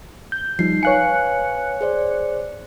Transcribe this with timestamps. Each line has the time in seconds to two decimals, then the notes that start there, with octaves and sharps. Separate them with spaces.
0.32 G6
0.59 F3 G3 D#4 C7
0.83 B4 C#5 F5 G#5 F#6 C#7
1.81 G#4 C5 D5